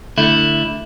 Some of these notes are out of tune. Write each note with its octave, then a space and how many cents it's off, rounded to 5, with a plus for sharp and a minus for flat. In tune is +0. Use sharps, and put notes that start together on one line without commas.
D3 -5 A3 +0 E4 +0